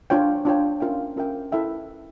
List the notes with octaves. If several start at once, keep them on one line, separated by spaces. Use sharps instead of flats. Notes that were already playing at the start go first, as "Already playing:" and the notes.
D4 F4 C#5 G5
D4 F4 C#5 G5
C#4 F4 A#4 E5 G5
C#4 F4 A#4 E5 G5
E4 A4 E5 G5